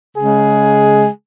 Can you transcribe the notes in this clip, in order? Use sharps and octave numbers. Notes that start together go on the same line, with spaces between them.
C#3 G#3 G#4